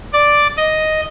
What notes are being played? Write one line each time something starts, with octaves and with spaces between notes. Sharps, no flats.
D5
D#5